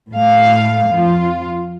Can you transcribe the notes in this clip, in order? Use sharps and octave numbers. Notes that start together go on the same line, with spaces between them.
A2 A3 F5
F2 F4